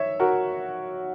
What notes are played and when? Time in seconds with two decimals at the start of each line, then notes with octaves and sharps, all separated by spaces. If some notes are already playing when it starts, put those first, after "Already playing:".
Already playing: C#5 E5
0.20 F#4 A#4